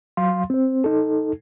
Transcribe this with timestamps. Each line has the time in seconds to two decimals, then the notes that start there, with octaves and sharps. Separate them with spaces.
0.17 F#3 F5 C6
0.50 C4 C5
0.84 D#4 A4